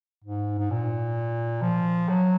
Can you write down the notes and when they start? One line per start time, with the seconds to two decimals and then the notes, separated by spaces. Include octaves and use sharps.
0.24 G#2
0.59 G#2
0.71 A#2
1.62 F3
2.09 F#3